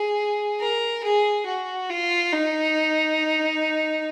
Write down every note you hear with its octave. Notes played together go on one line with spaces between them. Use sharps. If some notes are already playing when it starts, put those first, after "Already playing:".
Already playing: G#4
A#4
G#4
F#4
F4
D#4